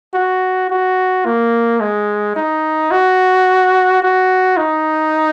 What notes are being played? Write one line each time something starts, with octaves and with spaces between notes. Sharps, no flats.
F#4
F#4
A#3
G#3
D#4
F#4
F#4
D#4